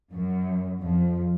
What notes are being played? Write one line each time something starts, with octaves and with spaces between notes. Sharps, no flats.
F#2
F2